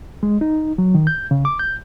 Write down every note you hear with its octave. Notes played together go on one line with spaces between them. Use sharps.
G#3
D#4
F#3
D#3
G6
C#3
D6
G6